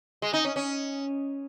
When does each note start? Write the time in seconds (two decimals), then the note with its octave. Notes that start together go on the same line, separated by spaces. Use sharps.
0.22 G#3
0.33 D#4
0.45 C#4
0.56 C#4